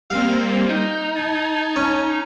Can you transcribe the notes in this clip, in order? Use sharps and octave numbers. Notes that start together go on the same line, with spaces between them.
G3 A#3 C4 F5
D#4 G6
A5 G#6
C#4